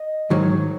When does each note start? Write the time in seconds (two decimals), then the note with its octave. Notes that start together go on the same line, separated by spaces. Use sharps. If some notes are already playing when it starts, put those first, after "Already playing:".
Already playing: D#5
0.30 G#2 D#3 F#3